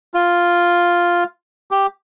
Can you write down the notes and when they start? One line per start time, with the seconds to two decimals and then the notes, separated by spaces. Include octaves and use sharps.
0.14 F4
1.71 G4